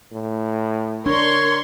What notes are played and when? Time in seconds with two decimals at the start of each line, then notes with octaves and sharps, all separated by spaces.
0.12 A2
1.06 D4 A#4 C#5 C6 C#6